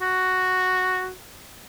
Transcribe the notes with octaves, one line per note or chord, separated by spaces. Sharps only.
F#4